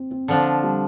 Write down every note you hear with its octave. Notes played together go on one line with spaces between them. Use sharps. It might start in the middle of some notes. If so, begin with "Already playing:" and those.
Already playing: C4
C4
D3 F3 D4
G3